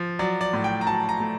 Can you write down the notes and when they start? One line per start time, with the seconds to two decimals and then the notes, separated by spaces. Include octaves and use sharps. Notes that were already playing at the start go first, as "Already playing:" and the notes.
Already playing: F3
0.19 F#3 D5
0.41 D5
0.53 A2
0.64 G5
0.81 A#5
0.86 F#3 A5
1.09 A#5
1.20 A3